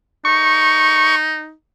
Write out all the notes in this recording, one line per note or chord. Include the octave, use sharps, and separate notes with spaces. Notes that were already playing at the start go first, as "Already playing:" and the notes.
D#4 C#6